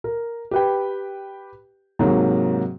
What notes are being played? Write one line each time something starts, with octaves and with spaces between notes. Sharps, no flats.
A#4
G4 B4 G5
G#2 C3 F#3 A#3